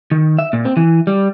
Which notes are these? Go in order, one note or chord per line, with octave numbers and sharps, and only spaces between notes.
D#3
E5
A#2
C4
E3
G3